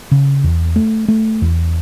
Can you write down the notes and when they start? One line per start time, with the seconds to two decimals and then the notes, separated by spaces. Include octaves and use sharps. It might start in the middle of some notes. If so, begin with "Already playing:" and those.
0.11 C#3
0.44 E2
0.76 A3
1.08 A3
1.42 E2